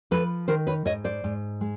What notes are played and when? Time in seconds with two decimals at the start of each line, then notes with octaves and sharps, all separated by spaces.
0.11 F3 A4 B4
0.48 D#3 A#4 C5
0.67 B4 C#5
0.85 G#2 C#5 D#5
1.04 C5 D5
1.24 G#2
1.61 G#3